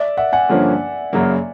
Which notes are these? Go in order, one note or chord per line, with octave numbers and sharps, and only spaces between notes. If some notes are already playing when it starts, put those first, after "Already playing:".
Already playing: D5 E5
E5 F#5
F#5 G#5
G2 D3 F3 A#3 C#4
F#2 C#3 F#3 A#3